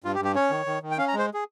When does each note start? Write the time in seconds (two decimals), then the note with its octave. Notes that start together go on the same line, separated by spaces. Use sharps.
0.04 G2 F4
0.14 G4
0.19 G2
0.25 G4
0.35 C#4 C#5
0.51 D#3
0.66 D#3
0.82 D#3
0.91 G5
0.98 C#4 F5
1.08 A#5
1.14 G#3
1.19 C5
1.34 G#4